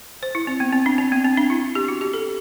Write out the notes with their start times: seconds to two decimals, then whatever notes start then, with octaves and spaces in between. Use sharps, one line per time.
0.23 C5
0.35 E4
0.47 C4
0.60 B3
0.73 C4
0.86 D4
0.98 C4
1.12 B3
1.25 C4
1.37 D4
1.50 E4
1.75 G4
1.88 F#4
2.01 G4
2.13 A4